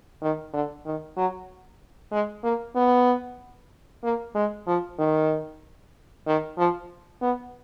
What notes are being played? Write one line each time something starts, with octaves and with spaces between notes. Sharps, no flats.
D#3
D3
D#3
F#3
G#3
A#3
B3
A#3
G#3
F3
D#3
D#3
F3
B3